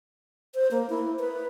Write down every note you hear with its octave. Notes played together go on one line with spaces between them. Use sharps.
C5
A#3
E4
B4